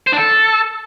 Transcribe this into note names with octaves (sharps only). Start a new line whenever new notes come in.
C5
D4
A4